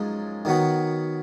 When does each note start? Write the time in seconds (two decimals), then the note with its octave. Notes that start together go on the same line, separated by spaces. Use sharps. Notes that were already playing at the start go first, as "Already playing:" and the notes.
Already playing: F#2 F3 G#3 D#4
0.45 D#3 F#3 B3 F#4